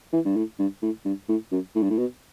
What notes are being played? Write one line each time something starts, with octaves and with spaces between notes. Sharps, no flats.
E3
G2
A2
G2
A2
G2
A2
F#2
A2
G2
A2
B2